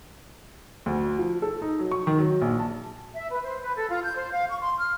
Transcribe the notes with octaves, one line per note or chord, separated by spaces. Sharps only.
D2
F3
A4
D#4
F#3
C#6
D#3
F#3
A#1
A5
E5
B4
C5
B4
A4
F4
G6
C5
F5
C#6
C6
F6